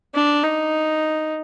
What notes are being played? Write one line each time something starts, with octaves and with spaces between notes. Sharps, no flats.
D4
D#4